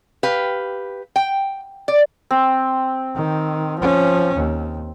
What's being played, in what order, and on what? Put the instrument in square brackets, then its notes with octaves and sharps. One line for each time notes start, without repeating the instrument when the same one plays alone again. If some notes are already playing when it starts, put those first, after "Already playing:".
[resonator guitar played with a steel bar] G4 B4 F5
G5
D5
[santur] C4
[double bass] D#3
F3 C#4
D#2